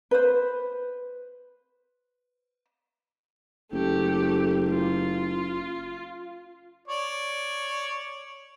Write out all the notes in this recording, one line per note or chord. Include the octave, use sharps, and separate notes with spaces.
B4 C5
F#1 A3 G4
F4
C#5 D5